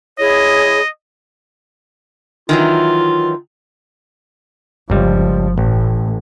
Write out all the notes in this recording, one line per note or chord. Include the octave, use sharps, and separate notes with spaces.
E4 G#4 C#5 D#5
D#3 E3 F#3 F4
G1 C#2 F3 G3
A1 A2